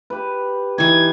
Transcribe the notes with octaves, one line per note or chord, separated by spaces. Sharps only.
G4 B4
E3 D#4 G4 G#6